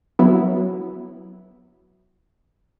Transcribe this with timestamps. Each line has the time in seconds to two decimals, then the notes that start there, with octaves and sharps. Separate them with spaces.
0.19 F#3 B3 E4